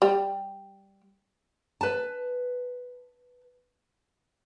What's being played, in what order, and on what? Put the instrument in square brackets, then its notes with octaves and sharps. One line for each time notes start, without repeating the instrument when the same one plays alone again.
[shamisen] G3
[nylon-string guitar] B4 A5